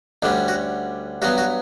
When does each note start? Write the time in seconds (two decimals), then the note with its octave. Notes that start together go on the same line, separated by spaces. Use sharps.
0.23 D2 D3 G3 C#4 D4
0.48 F#4
1.22 G2 F#3 B3 F#4
1.38 F#4